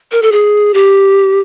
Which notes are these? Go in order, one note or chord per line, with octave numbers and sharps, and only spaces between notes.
A#4
A4
G#4
G4